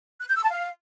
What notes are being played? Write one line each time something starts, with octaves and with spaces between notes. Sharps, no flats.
F#6
G6
E6
A5
F5